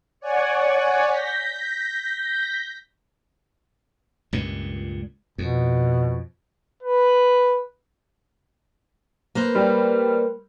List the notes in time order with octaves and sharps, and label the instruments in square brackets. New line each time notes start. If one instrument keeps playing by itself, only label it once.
[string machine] C#5 D5 F#5 G#5
G6 A#6 B6
[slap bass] C#2 G2 A#2
[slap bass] F2 [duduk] B2
[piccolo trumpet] B4
[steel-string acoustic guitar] A#3 B4 C5
[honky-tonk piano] G3